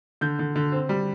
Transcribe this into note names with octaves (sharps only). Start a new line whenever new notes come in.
D3 G6
D3
D3
C4
G3